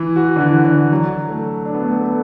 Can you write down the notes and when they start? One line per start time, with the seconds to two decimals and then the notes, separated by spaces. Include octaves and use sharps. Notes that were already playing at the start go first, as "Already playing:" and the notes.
Already playing: E3
0.16 F#4
0.36 D3
0.40 E3
0.65 D3
0.91 F#3
1.29 A3
1.66 D4
1.74 B3
1.83 A3
1.92 B3
2.04 A3